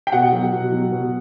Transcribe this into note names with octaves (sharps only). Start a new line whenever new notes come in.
G5
B2 F#5
F#3
B2
F#3
B2